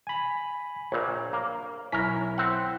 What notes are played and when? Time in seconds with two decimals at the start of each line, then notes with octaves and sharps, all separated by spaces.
0.07 G#5 B5
0.92 A#1 A#2 C#5
1.33 A#3
1.92 B1 C#4 E4 A#4 B6
2.38 C4 F#5